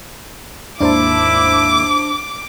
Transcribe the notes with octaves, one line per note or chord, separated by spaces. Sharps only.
D#2 G#2 A#3 D4 E4 C5 A5 D6